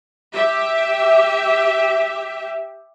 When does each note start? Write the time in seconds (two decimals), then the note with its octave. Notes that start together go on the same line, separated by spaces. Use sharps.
0.34 G4 E5